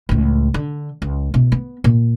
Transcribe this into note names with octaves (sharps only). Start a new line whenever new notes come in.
C#2 A2
D3
C#2
B2 E4
B3
A#2